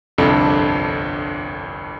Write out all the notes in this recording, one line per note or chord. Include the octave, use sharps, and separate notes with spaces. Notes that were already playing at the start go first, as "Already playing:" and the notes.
G1 C2 F2 D4 A4